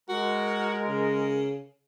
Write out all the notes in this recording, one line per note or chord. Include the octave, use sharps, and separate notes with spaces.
G#3 F#4 A#4
C#3